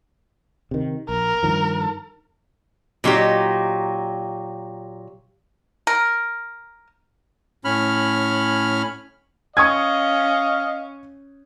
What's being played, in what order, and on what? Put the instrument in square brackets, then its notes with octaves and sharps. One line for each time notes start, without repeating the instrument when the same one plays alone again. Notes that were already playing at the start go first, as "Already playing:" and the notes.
[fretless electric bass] C3 D#3
[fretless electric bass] A#1 [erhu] A#4
[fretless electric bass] G2 D#3 F3
[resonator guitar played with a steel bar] A#2 F#3 D#4 G4
[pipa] A#4
[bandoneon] A2 C#4 B5 F6
[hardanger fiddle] C#4 [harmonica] D#5 [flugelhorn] F5 [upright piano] C#6 D#6 G#6